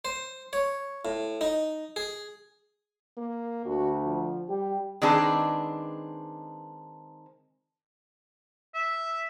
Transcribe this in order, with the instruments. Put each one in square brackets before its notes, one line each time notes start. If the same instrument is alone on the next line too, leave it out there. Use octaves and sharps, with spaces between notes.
[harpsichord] C5
C#5
A2
D#4
G#4
[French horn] A#3
[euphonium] D2 [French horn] F#4
[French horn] F3
[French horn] G3 [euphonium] G4
[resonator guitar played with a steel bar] D#3 G#3 C4 D4 G#4 B4
[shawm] E5